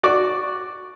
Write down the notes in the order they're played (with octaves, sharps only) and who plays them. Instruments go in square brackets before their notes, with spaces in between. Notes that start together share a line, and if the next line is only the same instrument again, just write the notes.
[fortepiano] F#4 D5 D6